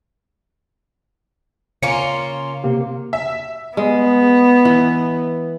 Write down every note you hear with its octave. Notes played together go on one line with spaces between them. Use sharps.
C#3 A#3 C#4 F4 C#7
C3 A#3 G4
E5
G#3 B3
E3